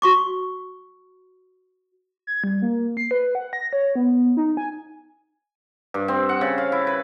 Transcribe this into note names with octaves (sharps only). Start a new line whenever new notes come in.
F#4 C#6 D6
G#6
G3
A#3
C7
B4
F#5
A#6
C#5
B3
B3
D#4
G#5
G2
C4
F#5
C#3
F5
E4
B4